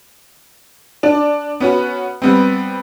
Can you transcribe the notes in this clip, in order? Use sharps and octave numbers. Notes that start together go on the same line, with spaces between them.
D4 D5
B3 C#4 F#4
G3 B3 C4